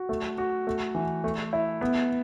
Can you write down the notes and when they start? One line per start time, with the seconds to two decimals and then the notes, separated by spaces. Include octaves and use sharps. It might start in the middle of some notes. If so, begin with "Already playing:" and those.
Already playing: F#4
0.09 A3
0.38 F#4
0.67 A3
0.95 E3
1.24 A3
1.53 E4
1.81 B3